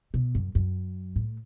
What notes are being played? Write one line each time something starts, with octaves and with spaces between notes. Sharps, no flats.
B2
F#2
F#2
A2